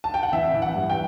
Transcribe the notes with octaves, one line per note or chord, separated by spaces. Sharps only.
A5
G5
F#5
E3 E5
E3
F#5
G2
G5